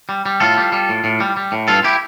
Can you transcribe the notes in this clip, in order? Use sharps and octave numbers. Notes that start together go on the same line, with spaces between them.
G3
G3
A2 F4 A4
G3
G3
A2
A2
G3
G3
A2
G2 F4 A4
E4 G4